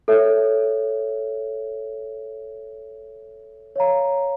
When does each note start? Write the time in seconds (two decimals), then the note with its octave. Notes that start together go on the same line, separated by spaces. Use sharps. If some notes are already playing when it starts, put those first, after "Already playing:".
0.08 A4 C#5 E5
3.76 C#5 F5 A#5